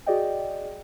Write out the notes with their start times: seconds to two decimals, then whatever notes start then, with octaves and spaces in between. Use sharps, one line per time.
0.06 F#4 G#4 D5 D#5 G5